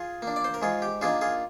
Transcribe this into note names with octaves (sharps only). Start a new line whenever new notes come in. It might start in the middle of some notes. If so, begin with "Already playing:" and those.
Already playing: F4 G#4
A#3 D4
D5
C5
A#4
G#2 F4 G#4
G4
D#3 A#3 D4 F4 G#4
F4 G#4